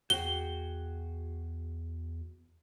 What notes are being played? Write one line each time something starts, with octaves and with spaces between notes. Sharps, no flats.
E2 F#4 G#4 G5 G7